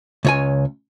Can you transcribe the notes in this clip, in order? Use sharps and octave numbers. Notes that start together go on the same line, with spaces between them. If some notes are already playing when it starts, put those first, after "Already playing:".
C#2 C#5 G#5